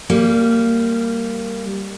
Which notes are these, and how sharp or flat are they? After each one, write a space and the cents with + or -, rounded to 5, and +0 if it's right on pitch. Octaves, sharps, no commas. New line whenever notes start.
G3 +0 A#3 -15